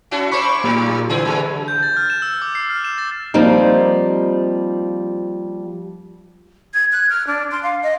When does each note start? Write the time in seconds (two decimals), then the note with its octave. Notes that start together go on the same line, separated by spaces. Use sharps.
0.11 C#4 E4 F#4
0.31 G#3 C5 B5 C#6 D6
0.64 A#2 F#3 D#4
1.09 D3 E3 B3 G#4
1.25 F#3 G#3
1.68 G6
1.83 A6
1.97 F6
2.10 E7
2.22 E6
2.42 D6
2.55 C7
2.70 F6
2.84 E7
2.98 A6
3.34 F3 G3 A#3 C4 D#4
6.74 G#6
6.92 F#6
7.10 F6
7.27 D4
7.51 C6
7.63 F5
7.83 D#5